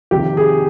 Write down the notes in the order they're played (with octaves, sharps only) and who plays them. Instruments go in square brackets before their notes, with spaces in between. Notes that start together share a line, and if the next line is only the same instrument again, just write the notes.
[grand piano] F2 C3 D#3 G4
G#4